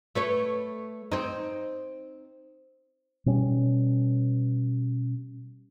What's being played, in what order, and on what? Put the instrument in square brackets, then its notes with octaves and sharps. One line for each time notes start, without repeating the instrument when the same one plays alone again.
[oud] A3 B4 C#5
C4 D#4
[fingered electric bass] B2 G3 C#4